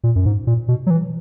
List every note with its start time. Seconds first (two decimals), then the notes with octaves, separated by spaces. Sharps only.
0.04 A#2
0.16 F#2
0.26 G#2
0.47 A#2
0.68 B2
0.87 F#3
0.90 E3